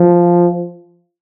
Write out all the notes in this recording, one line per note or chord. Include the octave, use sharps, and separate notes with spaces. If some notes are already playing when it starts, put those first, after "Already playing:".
Already playing: F3